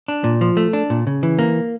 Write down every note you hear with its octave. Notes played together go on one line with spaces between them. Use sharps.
D4
A#2
F3
A3
D4
A#2
C#3
E3
A#3